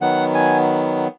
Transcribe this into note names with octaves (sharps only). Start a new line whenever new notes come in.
D#3 F#3 B3 F#5
G#5